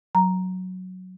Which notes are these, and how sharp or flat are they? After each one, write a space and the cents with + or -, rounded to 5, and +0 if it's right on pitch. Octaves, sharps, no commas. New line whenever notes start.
F#3 +0 A#5 +0